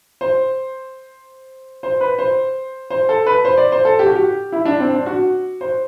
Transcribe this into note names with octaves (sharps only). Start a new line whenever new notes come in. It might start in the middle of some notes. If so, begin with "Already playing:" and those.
C5
C5
B4
C5
C5
A4
B4
C5
D5
C5
A4
G4
F#4
G4
E4
D4
C4
D4
F#4
C5